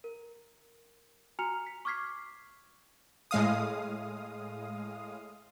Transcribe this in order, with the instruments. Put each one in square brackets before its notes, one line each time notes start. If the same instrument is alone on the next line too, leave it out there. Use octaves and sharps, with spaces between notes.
[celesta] A#4
F#4 G#5 A#5 F6 C#7 F7
B6
C#6 D6 F6 G#6 B6 C7
[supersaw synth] A2 G#3 F5 D#6